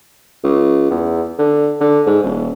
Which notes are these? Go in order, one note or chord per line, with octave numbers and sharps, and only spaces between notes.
C#2
E2
D3
D3
G#2
D#1